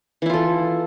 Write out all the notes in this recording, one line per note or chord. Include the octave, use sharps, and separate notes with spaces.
E3 E4 F4 A4